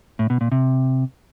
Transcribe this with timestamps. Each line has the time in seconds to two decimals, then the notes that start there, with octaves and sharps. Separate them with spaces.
0.19 A2
0.30 B2
0.41 A#2
0.52 C3